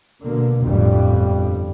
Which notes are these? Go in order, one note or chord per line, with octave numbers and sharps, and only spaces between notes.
B2 D3 A#3
G1 F2 A2 G3